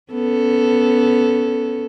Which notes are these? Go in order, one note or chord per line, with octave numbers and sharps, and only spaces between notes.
B3 C#4 A4